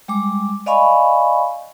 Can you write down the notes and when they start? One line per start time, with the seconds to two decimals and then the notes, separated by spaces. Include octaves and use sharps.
0.08 G3 G#3 D6
0.66 D5 D#5 F5 G#5 B5 C#6